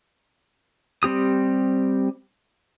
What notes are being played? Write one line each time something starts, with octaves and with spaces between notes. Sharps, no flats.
G3 C4 G4 D#6